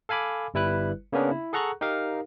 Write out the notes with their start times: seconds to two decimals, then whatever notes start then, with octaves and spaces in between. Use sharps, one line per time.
0.09 A4 F5 G#5 B5 D6
0.54 G1 G3 E4 B4 F#6
1.13 C#3 A#3 B3 C#4 D4
1.31 E4
1.53 G#4 A4 F#5 A#5 C#6 F#6
1.81 D#4 G4 A#4 F5